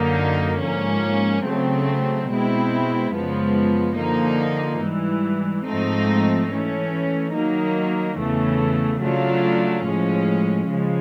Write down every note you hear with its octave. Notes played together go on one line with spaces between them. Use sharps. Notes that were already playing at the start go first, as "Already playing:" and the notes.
Already playing: F#2 D3 F#3 A#3 D#4
G#2 F3 A#3 C#4
C#3 F#3 A3 C4
B2 G#3 C4 E4
F#2 C#3 F3 G#3 B3
D3 F3 A#3 D#4
G#2 E3 G3
G#2 F3 A3 C4 D#4
E3 A3 C#4
D#3 F#3 A#3 D#4
E2 C#3 E3 A3
C#3 F#3 A3 D4 F4
A2 F3 G#3 C#4
C#3 F3 G#3